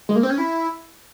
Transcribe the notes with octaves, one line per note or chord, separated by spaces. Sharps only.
G#3
A#3
C4
C#4
E4